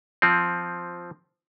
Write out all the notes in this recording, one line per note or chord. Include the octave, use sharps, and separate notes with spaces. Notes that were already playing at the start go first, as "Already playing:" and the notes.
F3 C4